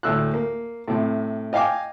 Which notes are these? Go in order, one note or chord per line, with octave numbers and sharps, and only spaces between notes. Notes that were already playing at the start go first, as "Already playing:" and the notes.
D2 A2 E6 F#6
A#3
A2 C3
D#5 F5 G5 G#5 D6